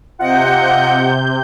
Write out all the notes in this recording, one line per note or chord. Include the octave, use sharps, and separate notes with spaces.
C3 F4 D#5 F#5 G6